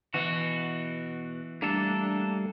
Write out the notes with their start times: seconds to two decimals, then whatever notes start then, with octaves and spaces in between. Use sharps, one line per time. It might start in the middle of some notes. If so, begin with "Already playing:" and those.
0.14 B2 E3 F#4
1.62 G3 A3 A#3 D4 A4